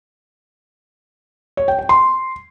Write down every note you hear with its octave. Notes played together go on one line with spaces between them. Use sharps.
C#5
G5
G5
C6